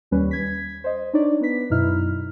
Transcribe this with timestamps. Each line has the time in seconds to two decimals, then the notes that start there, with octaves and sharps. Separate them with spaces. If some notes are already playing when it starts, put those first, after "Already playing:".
0.11 D#2 G3 C#4 B4
0.31 G#6 B6
0.84 C5 D#5
1.13 D4 D#4 C#5 D5
1.41 B3 B4 B6
1.70 F#2 B2 D#4 E4 F6